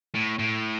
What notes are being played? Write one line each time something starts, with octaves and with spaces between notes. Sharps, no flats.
A2
A2